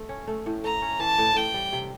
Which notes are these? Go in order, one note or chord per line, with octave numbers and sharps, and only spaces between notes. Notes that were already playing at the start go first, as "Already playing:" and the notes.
Already playing: A3
C#4
A3
A2
A3 A#5
C#4
E3 A5
A2
A2 G5
G3
C3